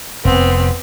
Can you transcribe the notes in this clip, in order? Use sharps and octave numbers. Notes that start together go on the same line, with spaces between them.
F1 F2 B3 C4